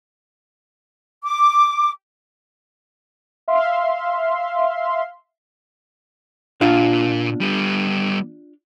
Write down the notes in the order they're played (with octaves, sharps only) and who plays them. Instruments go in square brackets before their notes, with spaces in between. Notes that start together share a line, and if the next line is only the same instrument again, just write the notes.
[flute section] D6
[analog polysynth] E5 F5 C6
[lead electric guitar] A#2 [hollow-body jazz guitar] D4 F4 F5
[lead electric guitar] G3 B3